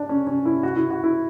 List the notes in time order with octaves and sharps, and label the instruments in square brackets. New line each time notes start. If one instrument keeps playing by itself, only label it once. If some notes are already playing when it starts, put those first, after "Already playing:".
Already playing: [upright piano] D4
C#4
C#4
E4
F#4
E4
F#4
E4